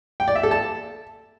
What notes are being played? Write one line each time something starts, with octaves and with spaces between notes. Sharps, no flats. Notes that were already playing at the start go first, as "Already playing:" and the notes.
G5
D5
E5
A4
A5